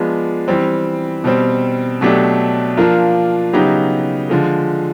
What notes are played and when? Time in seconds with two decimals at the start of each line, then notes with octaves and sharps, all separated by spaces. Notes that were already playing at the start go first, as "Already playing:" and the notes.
Already playing: F3 G#3 B3 D4
0.48 E3 G3 C4
1.24 B2 G3 C4
2.01 B2 F#3 A3 D4 G4
2.77 F3 A#3 D4 F4 A#4
3.53 C#3 F#3 B3 D#4 G4
4.29 D3 F3 G#3